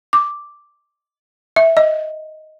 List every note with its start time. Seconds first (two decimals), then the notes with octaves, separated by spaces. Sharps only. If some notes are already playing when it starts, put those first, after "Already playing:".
0.13 D6
1.56 E5
1.77 D#5